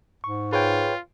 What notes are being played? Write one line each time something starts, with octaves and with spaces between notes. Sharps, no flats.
G#2 C#6
F4 G#4 B4 C#5 G5